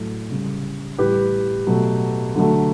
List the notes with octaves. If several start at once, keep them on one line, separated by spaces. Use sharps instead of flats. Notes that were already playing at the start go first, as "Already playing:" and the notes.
Already playing: A2 F#3 A3
C#3 G3
A2 E3 G3 G4 B4
B2 F#3 A3
D3 F#3 A3